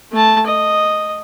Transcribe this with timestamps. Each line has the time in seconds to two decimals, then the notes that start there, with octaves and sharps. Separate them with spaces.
0.12 A3 A5
0.46 D#5